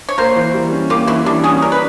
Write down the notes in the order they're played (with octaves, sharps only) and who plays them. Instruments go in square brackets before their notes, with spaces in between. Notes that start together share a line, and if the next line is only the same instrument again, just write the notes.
[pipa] C#5
[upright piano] A#3 [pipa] A#4 C5
[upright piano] E3
G3
C#4
[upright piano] A#3 [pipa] F4 G4
[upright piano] E3 [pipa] E4 F#4
[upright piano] G3 [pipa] D4 E4
[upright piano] C#4 [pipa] F#4 G#4
[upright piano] D4 [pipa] A#4
[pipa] B4